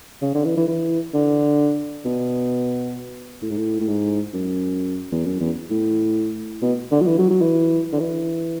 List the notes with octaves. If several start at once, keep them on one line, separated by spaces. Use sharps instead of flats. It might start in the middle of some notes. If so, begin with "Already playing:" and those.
C#3
D3
E3
E3
E3
D3
B2
A2
G#2
A2
A2
G#2
F#2
E2
F#2
E2
A2
B2
D3
F#3
E3
F#3
F#3
E3
D3
E3